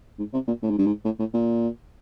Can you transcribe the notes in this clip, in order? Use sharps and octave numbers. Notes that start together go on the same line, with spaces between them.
G#2
C3
A#2
A2
G#2
G2
G#2
A2
A2
A#2